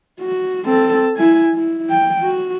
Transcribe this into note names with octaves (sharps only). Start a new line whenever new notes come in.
F#4
C4 A4
E4 G#5
E4
G5
F#4